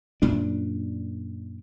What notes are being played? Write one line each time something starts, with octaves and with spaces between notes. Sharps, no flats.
F#2 A#2 D4